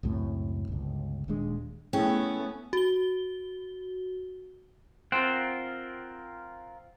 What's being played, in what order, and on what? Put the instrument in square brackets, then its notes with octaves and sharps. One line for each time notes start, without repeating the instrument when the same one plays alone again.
[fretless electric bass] C#2 F#2 A2 C4
G1 C#2
D#1 D#2 G#3 D4
[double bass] A3 B3 [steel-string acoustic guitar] C#4 [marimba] E4 G#4 G5
[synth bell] F#4 G7
[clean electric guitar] C4 [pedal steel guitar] F4 A#4 F#5